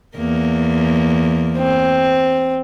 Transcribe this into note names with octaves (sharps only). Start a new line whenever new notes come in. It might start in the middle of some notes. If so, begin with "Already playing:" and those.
E2 A#3
C4